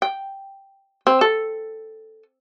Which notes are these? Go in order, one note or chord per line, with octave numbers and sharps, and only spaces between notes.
G5
C4
A4